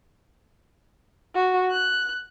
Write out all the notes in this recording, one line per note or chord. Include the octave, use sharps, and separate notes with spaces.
F#4
F#6